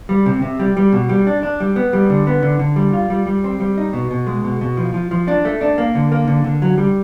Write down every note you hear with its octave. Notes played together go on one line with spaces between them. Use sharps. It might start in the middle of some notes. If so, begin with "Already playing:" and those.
G3
C3
C3
G3
G3
B2
G3
D4
D4
G3
B3
G3
D3
B3
D3
D3
G3
F4
G3
G3
C4
G3
D#4
B2
B2
G#3
B2
B2
F3
F3
F3
D4
A3
D4
A#3
D3
A#3
D3
D3
F#3
G3